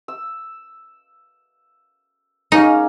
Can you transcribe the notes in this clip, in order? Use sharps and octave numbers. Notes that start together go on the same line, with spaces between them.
E6
G#3 A#3 C#4 D#4